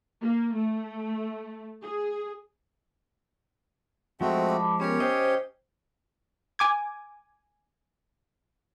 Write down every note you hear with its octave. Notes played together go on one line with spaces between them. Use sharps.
A#3
A3
G#4
F3 G#3 A3 C4 F#4
A5 B5 D6
B3 C#4 G4 A#4 C#5
C5 D#5 G5
G#5 D6 G#6